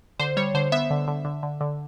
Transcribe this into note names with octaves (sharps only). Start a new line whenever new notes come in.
D3 C5
G3 C#5
D3 C5
B3 E5
D3
D3
D3
D3
D3